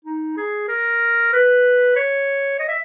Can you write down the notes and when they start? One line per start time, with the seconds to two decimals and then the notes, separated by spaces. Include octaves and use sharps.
0.05 D#4
0.37 G#4
0.69 A#4
1.33 B4
1.96 C#5
2.59 D#5
2.68 E5